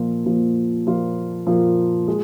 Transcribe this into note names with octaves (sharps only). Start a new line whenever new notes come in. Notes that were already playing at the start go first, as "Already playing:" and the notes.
Already playing: A#2 F3 A#3 F4
A#2 F3 A#3 F4
A#2 F3 A#3 F4
A#2 F3 A#3 F4
G#3